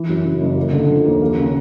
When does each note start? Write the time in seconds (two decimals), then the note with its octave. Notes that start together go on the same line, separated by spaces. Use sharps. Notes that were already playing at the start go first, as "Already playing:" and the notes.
Already playing: E3
0.09 F#2
0.25 C#3
0.41 F#1
0.57 A#3
0.72 D3
0.90 F3
1.05 D#2
1.22 A#3
1.37 C#3